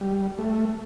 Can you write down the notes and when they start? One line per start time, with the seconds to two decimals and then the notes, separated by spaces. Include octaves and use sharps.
0.01 G3
0.39 A3